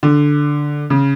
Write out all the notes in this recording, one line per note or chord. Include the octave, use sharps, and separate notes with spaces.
D3
C#3